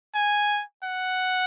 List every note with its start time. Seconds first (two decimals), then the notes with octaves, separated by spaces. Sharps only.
0.15 G#5
0.84 F#5